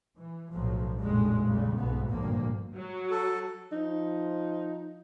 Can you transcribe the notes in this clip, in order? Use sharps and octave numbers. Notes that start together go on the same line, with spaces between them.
E3
B1 A2 F3 F#3
F1 A#1 F2 A2 G3 G#3
A#1 F2 C#3 G3
B1 G#2 B2 B3
G#1 D2 G2 A#2 F3 A#3
F#3
A4
F3 D#4